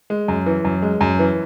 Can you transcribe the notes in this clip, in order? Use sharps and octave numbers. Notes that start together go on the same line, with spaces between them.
G#3
F#2
E3
F#2
G#3
F#2
E3